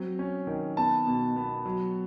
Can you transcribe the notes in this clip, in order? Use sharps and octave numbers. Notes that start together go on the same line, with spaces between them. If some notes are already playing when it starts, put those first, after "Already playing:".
Already playing: F#3 C4
C#4
D#3
B3 A5
B2
B3
F#3